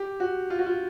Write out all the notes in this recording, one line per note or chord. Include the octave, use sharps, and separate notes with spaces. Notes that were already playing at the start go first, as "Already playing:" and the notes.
Already playing: G4
F#4
F4
F#4
F4